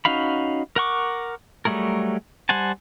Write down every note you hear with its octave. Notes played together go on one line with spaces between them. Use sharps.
C#4 D#4 F#4 F5 B5
A#4 F#5 C#6 D6
F#3 G3 A3 G#4 A#4
G3 C5 F#5 G#5 A5